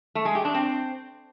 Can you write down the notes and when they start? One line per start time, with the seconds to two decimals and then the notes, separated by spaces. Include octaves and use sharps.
0.15 A3
0.25 G#3
0.35 G4
0.45 D4
0.54 C4